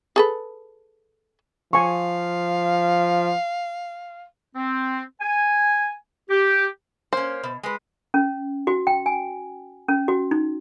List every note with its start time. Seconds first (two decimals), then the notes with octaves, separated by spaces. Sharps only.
0.16 G#4 A4 B4
1.73 F3 F5 G#5 C#6
4.56 C4
5.20 G#5
6.29 G4
7.13 A#3 C#4 C5
7.43 B2
7.63 G#3 B4
8.14 C#4
8.67 F#4
8.87 G5
9.06 G#5
9.88 C#4
10.08 F#4
10.31 D#4